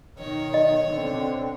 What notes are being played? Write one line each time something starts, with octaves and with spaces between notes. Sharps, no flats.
B2 D#3 C#5
D#5
B2 D3 C4